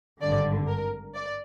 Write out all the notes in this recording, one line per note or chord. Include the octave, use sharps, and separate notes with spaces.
G#1 G2 D3 D5
A#4
D5